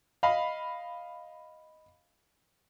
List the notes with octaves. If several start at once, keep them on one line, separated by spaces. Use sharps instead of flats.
D#5 F5 B5